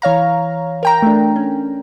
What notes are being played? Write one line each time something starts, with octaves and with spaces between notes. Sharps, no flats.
E3 C#5 F5 A#5
A#4 G5 A#5
A3 D4
C#4